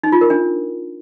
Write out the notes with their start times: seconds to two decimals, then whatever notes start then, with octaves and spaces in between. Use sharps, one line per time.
0.04 D#4
0.12 F4
0.21 A#4
0.30 D4